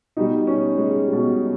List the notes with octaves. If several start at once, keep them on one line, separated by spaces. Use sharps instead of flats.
B2 G3 D#4
C#4
G#3
B2 G3